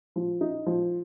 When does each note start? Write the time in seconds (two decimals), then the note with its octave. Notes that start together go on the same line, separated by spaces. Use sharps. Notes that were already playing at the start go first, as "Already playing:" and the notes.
0.16 F3
0.41 D#4
0.66 F3